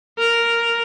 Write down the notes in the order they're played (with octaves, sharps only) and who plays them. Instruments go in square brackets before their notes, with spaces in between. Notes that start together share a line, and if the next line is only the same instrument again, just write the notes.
[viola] A#4